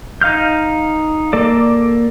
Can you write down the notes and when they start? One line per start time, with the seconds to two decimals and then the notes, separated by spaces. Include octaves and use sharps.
0.22 D#4 F5 F6 G6
1.33 A#3 A4 D5